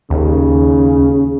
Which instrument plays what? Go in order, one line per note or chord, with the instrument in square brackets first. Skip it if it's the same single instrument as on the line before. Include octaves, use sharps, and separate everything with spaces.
[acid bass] D#2 [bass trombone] C#3